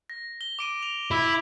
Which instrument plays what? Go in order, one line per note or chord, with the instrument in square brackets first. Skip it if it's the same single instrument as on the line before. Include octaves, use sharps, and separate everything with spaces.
[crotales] A#6
G7
D6 D7 D#7
F7
[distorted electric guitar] E4